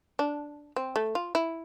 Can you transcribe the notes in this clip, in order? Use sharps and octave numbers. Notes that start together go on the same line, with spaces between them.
D4
C4
A3
F4
E4